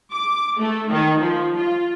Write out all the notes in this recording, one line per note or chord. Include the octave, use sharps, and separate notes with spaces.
D6
A3
D#3
F3
F4